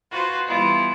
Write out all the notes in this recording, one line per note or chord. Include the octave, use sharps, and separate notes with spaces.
F4 F#4 B4 C5
E3 G3 B3 E4 F4